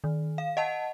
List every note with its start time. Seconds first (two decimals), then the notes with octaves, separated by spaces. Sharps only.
0.04 D#3
0.38 F5
0.57 D#5 F#5 A5